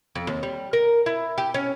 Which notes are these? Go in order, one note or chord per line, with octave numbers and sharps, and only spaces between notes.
F2
D#2
G3
A#4
E4
G4
C#4